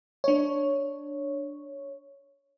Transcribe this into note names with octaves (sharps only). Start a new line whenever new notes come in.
D4 C#5